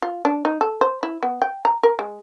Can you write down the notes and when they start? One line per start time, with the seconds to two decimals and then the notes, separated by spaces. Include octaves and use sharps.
0.02 F4
0.25 D4
0.45 D#4
0.61 A4
0.81 C5
1.03 E4
1.23 B3
1.42 G5
1.65 A#5
1.83 A#4
1.99 G#3